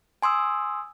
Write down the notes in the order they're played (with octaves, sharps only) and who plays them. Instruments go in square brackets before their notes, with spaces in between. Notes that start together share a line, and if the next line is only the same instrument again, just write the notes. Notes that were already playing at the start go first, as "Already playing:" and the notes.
[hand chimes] G#5 C6 D#6 E6